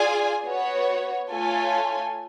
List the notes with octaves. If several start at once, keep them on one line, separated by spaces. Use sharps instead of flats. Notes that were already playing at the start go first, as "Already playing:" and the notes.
Already playing: F4 G#4 D5 G#5
B3 F#4 C#5
A3 F4 A4 C#5 G#5